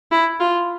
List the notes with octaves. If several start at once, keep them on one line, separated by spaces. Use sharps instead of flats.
E4
F4